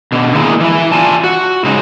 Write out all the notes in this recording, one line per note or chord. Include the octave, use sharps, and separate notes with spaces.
B2 D3
D#3 G#3 A#3 E4 G#4 A#4
E3 E4
F4 D5 G#5 A5
F#4
C#3 G#3 D#4